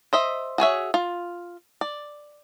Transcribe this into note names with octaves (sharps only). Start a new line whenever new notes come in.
C5 D#5 E5
F#4 G#4 C#5 E5
F4
D5